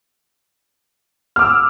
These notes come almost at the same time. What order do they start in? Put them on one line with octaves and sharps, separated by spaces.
F6 D6 E6